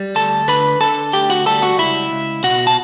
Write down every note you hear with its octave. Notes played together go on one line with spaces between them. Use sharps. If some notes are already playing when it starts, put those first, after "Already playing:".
Already playing: G3
D2 A4 A5
D3 B4 B5
D3 A4 A5
D2 G4 G5
F#4 F#5
G3 A4 A5
F#4 F#5
C#2 E4 E5
C#2
B2 F#4 F#5
A5